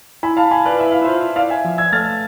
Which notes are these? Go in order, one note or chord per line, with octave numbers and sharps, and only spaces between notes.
E4 G#5 B5
F5 A5
G#5 B5
B4 D5
F4
E4 E5
F5
E4
F4 C5 E5
E4 D5 F5
E5 G#5
F3
E6 G#6
A3 F6 A6